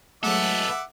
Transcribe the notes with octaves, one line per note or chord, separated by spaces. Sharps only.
F#3 G#3 A3 B3 A4 E5 F#5 D6